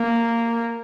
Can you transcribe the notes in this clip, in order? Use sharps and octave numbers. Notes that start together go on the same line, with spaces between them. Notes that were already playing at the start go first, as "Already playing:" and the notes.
Already playing: A#3